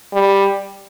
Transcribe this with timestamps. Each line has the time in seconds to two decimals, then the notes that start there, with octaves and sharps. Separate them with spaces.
0.14 G3